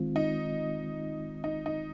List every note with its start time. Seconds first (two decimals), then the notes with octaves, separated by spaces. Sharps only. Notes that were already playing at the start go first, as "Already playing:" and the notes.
Already playing: D#3 G#3 C4 F4
0.16 D#4
1.44 D#4
1.66 D#4